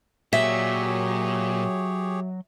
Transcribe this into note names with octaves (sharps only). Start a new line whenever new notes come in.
A#2 F#3 G4 G#4 C#5 E5